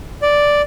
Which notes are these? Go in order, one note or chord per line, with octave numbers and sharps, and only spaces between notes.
D5